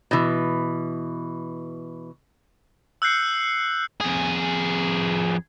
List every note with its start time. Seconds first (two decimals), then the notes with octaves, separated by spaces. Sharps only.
0.11 B2 E3
3.02 E6 F#6 G6 C7 C#7
4.00 F2 G#4